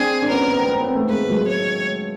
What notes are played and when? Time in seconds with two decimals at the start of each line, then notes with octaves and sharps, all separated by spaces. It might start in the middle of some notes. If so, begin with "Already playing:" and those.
Already playing: C4 D4 G#4
0.22 D4
0.30 B3 C#4 A#4
0.50 B3
0.58 C4
0.65 B3
0.72 C4
0.80 B3
0.87 C4
0.95 A3 B3
1.09 G#3 A#3 B4
1.30 F#3 G#3
1.48 C#5